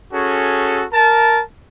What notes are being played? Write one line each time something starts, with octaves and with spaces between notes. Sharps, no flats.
C#4 F#4 G#4 A4
A#4 A5